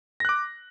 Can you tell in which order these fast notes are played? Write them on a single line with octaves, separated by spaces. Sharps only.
A#6 F#6 D6